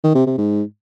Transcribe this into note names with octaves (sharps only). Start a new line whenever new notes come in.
D#3
C3
C3
G#2